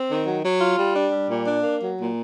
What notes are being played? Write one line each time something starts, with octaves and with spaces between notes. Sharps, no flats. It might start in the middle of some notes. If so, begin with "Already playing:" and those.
Already playing: C4
D#3
F#3
F#3
F4
G3
D4
G3
A#2
D4
A#3
F#3
A#2